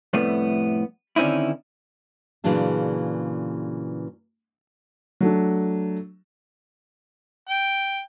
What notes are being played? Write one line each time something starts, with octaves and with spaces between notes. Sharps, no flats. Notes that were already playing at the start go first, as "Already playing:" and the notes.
F2 A2 C3 G3 A3 B3
D3 D#3 C4 C#4 D#4 E4
A#2 C#3 E3 F#3 D4 G#4
F#3 A3 D4
G5